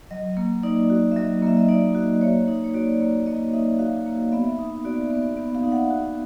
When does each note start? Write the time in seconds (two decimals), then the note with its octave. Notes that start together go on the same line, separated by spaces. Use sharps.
0.11 F#3 D#5
0.37 A#3
0.63 D#4 D5
0.90 F#4
1.12 E5
1.16 F#3 D#5
1.42 A#3 E5
1.57 D#5
1.69 D#4 D5
1.95 F#4
2.21 A#3 C#5
2.48 D#4
2.64 C#5
2.74 F#4 D5
3.00 A#3
3.26 A#3 D#5
3.53 D#4 E5
3.79 F#4 F5
4.06 A#3
4.32 B3 E5
4.58 D#4 E5
4.85 F#4 D5
5.11 B3
5.37 B3 E5
5.55 F5
5.63 D#4
5.72 F#5
5.90 F#4